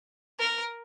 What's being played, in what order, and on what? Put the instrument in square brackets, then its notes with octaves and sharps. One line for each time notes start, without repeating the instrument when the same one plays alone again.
[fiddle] A#4